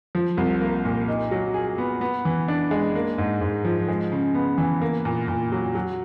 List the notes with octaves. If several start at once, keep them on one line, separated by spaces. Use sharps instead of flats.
F3
C2
A#3
A#2
D#4
F#3
G#4
B3
B3
E3
D4
G#3
A#3
G#2
G#2
F3
G#3
C#3
B3
E3
A#3
A#2
A#2
F#3
F#3